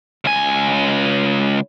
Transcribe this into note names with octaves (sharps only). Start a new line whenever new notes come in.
C#2 G#5